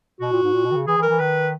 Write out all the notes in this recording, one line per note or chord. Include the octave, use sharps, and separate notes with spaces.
B2 F#4
A#2
G#2
A#2
B2
D#3
C#3
E3 G#4
E3
A#4
E3
D#3 B4